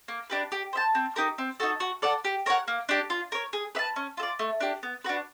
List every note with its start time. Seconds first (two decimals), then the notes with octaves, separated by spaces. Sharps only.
0.08 A#3
0.30 D4 G4 B4
0.52 G4
0.73 C5 E5 A5
0.95 C4
1.16 D#4 G4 A#4
1.38 C4
1.60 D#4 F#4 A4
1.80 F#4
2.02 A4 D5 F#5
2.25 G4
2.46 A#4 C#5 F#5
2.68 A#3
2.89 D4 G4
3.10 F4
3.32 A#4 C#5
3.53 G#4
3.75 B4 E5
3.79 A5
3.96 C#4
4.17 F4 A4
4.23 D5
4.39 A3
4.61 D4 G4
4.83 B3
5.04 D4 F#4 B4